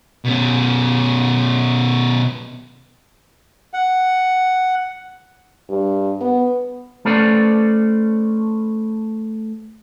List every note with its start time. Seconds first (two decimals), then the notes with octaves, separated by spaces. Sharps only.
0.25 B2 C#4
3.74 F#5
5.69 G2
6.21 B3
7.05 A3 C#4 A4 B4 C5 D5